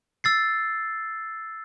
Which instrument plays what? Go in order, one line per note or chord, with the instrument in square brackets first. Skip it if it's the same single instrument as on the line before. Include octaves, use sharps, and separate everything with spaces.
[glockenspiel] E6 A6 C7